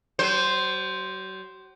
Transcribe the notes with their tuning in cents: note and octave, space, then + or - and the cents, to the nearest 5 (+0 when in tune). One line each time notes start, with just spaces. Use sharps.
F#3 +40 C5 +0